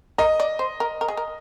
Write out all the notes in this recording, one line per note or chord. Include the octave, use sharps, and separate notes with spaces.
A#4 D#5
D5
C5
A#4
A#4
G#4
A#4